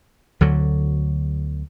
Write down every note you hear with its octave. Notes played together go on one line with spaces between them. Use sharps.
D2 D3 F#3